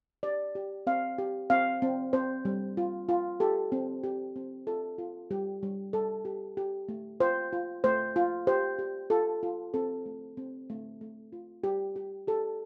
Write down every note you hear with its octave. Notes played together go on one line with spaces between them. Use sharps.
G4 D5
G4
C4 F5
G4
C4 F5
C4
C4 C5
G3
F4
F4
G4 A4
C4
G4
C4
F4 A4
F4
G3 G4
G3
G3 A4
G4
G4
A3
F4 C5
F4
A3 C5
F4
G4 C5
G4
F4 A4
F4
C4 A4
A3
C4
A3
A3
F4
G3 G4
G4
G4 A4